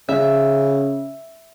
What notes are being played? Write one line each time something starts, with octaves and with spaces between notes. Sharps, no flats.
C#3 E5